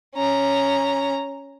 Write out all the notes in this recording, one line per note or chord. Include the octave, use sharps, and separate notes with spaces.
C#4 A#5